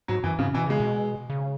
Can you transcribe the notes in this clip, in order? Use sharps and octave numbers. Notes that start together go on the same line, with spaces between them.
G#2 F#3
F#2 E3
G#2 C#3
B2 E3
C#3 G#3
B2
C#3